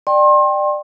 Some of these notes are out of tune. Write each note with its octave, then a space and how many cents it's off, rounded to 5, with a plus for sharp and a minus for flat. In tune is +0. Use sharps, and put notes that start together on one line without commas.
D5 +25 G5 +0 C6 +35